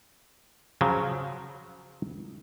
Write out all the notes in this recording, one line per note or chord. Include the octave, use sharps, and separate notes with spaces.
C#3 F3 F#3